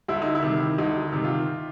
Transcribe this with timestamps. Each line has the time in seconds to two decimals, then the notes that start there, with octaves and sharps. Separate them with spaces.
0.08 D2 E4
0.22 D#4
0.35 E4
0.43 C3 D#3
0.78 D2 D#4
1.12 C3 D#3
1.24 F4